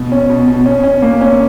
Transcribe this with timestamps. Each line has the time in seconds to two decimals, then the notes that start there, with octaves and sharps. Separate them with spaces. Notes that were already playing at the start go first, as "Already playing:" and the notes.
Already playing: B2
0.12 C#4
0.30 B2
0.47 B2
0.66 C#4
0.84 C#4
1.02 A#3
1.21 C#4